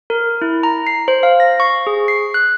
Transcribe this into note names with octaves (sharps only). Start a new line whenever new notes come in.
A#4
E4
A#5
C7
C5
F5
A#6
C#6
G#4
C7
F#6